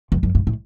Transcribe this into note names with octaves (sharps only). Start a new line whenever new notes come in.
E2
F#2
G2
A2